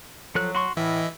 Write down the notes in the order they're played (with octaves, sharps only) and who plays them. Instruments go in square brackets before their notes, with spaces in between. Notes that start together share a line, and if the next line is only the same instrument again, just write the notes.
[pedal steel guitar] F3 A4 F#6 [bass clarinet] F#3
[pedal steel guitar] F#4 C6 C#6
[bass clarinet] A2 [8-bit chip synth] E3 E5 [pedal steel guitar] D#5